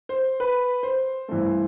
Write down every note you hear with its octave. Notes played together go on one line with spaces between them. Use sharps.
C5
B4
C5
G2 E3 A3 C4